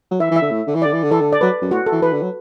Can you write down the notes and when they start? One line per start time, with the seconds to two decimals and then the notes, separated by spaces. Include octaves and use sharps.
0.11 F#3
0.20 E3 E5
0.31 E3
0.36 E5
0.42 D3
0.51 A2
0.67 D3
0.75 E3
0.82 D5
0.85 D3
0.93 E3
1.03 D3
1.11 E3 A4
1.20 D3
1.33 D5
1.41 F#3 B4
1.61 F#2
1.71 A2 F#4
1.86 A4
1.92 E3
2.02 E3 B4
2.12 D3
2.22 F#3